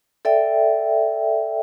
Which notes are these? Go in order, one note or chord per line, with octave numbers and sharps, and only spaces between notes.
A4 D5 E5 G5